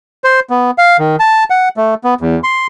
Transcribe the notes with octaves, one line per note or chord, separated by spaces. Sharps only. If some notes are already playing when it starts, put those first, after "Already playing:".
C5
B3
F5
D#3
A5
F#5
A3
B3
E2
C6